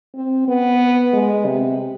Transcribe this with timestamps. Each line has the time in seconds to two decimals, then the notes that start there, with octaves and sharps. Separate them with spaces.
0.14 C4
0.48 B3
1.13 G#3
1.46 C3